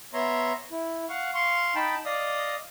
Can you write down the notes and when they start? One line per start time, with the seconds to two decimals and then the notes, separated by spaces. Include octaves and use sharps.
0.13 B3 C#5 E5 A#5 C6
0.71 E4
1.09 F5 F#5 C#6
1.34 F5 C6 C#6
1.75 D#4 G5 A5 B5
2.05 D5 D#5 F5 D#6